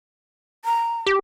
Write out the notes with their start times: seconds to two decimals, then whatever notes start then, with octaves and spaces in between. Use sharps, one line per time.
0.65 A#5
1.06 G4